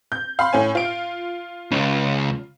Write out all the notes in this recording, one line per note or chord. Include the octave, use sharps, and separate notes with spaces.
G6
F5 B5 C6
A2 C#4 G#5
F4 D7
C#2 C#3